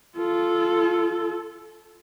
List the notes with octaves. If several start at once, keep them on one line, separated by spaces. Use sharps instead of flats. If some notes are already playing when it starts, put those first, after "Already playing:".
F4 A4